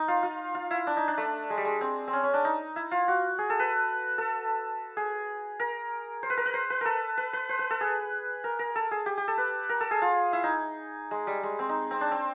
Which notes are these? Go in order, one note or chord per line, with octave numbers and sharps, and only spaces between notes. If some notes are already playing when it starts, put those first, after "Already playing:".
Already playing: D#4
F4
F4
F4
E4
D4
D#4
D4
A3
G#3
G3
G#3
C4
C4
C#4
C#4
D4
D#4
E4
F4
F#4
G#4
A4
B4
A4
G#4
A#4
C5
B4
A#4
B4
C5
B4
A4 A#4
B4
B4
C5
B4
A4
G#4
A#4
A#4
A4
G#4
G4
G4
A4
B4
A#4
A4
G#4
F4
E4
D#4
G#3
G3
G#3
C4
D#4
C4
D4
C4